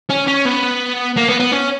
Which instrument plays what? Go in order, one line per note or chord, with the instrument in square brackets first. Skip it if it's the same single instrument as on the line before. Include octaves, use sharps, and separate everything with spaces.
[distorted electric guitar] C#4
C#4
B3
A#3
B3
B3
C#4